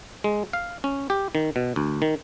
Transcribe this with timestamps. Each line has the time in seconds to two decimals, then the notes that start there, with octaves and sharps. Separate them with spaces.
0.24 G#3
0.53 F5
0.84 C#4
1.10 G4
1.35 D#3
1.56 B2
1.76 D2
2.02 D#3